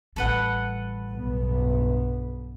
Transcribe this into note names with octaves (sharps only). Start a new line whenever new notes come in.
A1 G3 A4 B4 F#5
B1 G2 B3